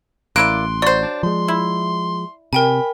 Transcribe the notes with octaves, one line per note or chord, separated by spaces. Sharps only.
A1 A#3 E4 D5 C6 F#6 D7
F#3 C5 D5
D4
F3 G#3 C6
E4
C3 A#4 G5 G#5 B5